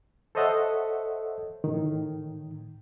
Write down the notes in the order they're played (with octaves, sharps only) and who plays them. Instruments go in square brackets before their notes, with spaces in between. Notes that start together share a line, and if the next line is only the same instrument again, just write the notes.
[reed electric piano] A4 C5 C#5 D#5 E5 F#5
A2 D#3